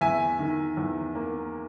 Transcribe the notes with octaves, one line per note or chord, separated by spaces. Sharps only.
E2 E5 G#5
D#3
E2
A#3